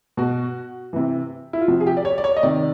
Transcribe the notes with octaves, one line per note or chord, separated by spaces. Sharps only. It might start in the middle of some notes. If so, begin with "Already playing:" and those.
B2 F#4
C3 E3
E4
F4
C3 F3 F#4
G#4
G4
D5
C#5
D5
C#5
D#5
C3 D#3 D5